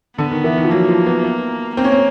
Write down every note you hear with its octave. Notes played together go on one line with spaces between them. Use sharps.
D3 B3
D#3
E3
D#3
F3
F#3 A#3
F3
B3
B3
A#3 C4
C#4
C4